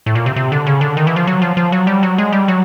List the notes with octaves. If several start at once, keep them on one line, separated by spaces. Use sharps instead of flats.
A2
A#2
C3
C3
D3
C#3
D3
D#3
E3
F3
F#3
F3
F3
F#3
G3
F#3
G#3
G3
F#3